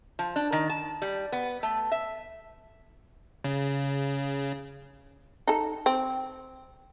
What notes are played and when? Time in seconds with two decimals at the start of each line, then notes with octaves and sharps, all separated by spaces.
0.19 F3
0.36 D4
0.52 D#3
0.69 A5
1.02 G3
1.32 B3
1.63 A3
1.92 E5
3.44 C#3
5.47 D#4 A4
5.86 C4